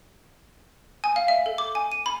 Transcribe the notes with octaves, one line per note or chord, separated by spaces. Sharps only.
G#5
F5
E5
A4
D6
G#5
D#7
B5